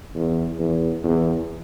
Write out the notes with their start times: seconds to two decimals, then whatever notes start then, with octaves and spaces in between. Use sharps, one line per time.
0.15 E2
0.59 E2
1.03 E2